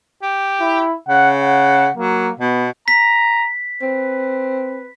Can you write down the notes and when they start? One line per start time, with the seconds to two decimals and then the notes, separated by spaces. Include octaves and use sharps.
0.22 G4
0.61 E4
1.08 C#3 F#5
1.42 F#5
1.97 F#3 A#3
2.40 B2 B3
2.88 A#5 B6
3.82 C4 B4